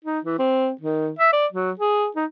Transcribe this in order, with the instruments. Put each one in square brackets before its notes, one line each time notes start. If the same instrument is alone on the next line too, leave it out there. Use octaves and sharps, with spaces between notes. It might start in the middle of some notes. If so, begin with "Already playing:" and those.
[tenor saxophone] D#4
E3
C4
D#3
E5
D5
F#3
G#4
D#4